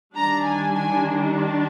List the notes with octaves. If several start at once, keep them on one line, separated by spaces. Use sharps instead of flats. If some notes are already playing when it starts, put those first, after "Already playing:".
D#3 G3 D4 A#5
G#5
G#5